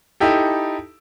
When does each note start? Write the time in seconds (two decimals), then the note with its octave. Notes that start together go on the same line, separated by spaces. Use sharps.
0.20 D#4 E4 G4 A4